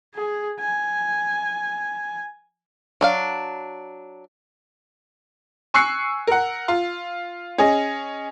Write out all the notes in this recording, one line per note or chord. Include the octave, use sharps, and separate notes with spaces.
G#4
G#5
F#3 D4 F5
G#5 C#6 E6 F#6 C7 C#7
A#4 F#5
F4
C#4 G#4 D#5